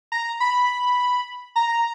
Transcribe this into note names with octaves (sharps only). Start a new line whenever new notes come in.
A#5
B5
A#5